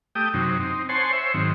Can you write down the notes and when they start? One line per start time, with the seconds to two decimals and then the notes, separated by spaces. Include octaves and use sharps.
0.15 A3 G4 G5 D#6
0.34 F#2 C3 F#3 D#4
0.60 C4 D#4
0.89 C5 C#5 F#5 G#5 A5 C6
1.13 C5 C#5 E5
1.34 G#2 D#3 F#3 C4